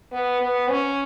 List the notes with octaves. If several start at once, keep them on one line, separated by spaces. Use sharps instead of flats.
B3
B3
C#4